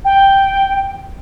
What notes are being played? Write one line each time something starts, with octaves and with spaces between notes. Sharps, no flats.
G5